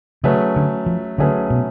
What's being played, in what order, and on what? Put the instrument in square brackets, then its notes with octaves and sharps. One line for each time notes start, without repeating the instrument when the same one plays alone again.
[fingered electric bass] C#3 [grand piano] F#3 A3 C#4 G#4 B4
[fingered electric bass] D3
F3
[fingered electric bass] D3 [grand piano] F#3 A3 C#4 G#4 B4
[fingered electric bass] B2